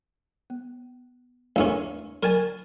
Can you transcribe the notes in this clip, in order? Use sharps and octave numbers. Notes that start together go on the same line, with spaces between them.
B3
A1 E2 C#4 D4 A#4
F#3 A#4 G#5 A5